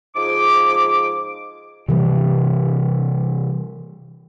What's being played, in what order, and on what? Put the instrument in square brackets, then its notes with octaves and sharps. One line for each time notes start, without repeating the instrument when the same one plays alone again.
[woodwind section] G#2 F3 G#4 D6
[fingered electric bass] C3 E3 G3